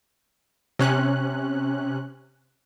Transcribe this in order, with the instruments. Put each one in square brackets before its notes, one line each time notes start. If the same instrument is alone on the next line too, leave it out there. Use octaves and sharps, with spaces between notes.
[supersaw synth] C3 C#4 F#6